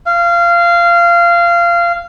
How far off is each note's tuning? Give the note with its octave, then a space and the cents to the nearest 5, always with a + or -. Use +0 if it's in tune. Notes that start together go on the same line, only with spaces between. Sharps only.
F5 -20